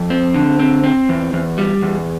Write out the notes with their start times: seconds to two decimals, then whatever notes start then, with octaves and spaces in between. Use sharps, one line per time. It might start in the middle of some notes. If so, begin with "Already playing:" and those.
Already playing: F2
0.10 C4
0.34 D3
0.59 C4
0.84 C4
1.09 E2
1.33 E2
1.58 G3
1.82 E2